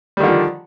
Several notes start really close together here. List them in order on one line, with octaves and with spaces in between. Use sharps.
G3 D#3 D3 F3